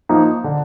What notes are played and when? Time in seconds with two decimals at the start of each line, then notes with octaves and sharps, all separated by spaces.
0.09 F3 A#3 D#4
0.44 D3